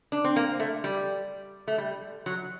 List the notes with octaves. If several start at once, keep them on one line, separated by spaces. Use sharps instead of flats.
D4
C4
A#3
A3
G3
A3
G3
F#3